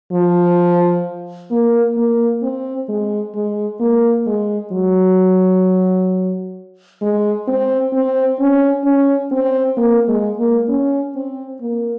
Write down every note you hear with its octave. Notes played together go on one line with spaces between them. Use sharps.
F3
A#3
A#3
C4
G#3
G#3
A#3
G#3
F#3
G#3
C4
C4
C#4
C#4
C4
A#3
G#3
A#3
C#4
C4
A#3